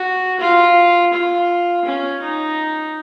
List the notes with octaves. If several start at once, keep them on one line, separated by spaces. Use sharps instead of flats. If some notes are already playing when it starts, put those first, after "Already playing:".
Already playing: F#4
F4
F4
C#4
D#4